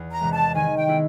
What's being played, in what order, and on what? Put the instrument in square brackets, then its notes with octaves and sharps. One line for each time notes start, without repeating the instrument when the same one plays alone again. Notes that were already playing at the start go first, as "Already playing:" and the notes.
Already playing: [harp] E2
[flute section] A#5
[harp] C3 E3 G#3
[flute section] A5
[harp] D#3 [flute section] G#5
[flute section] G5
[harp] G#3 B3 E4